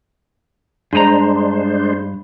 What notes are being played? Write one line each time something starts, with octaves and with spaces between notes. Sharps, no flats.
G2 G#3 D4 G#4 C5 A#5